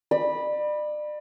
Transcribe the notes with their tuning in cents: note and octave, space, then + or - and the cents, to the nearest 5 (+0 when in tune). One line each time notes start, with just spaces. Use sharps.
D5 +35 B5 -10